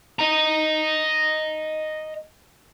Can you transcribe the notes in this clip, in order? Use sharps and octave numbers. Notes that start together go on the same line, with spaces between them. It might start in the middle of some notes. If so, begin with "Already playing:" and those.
D#5 A#5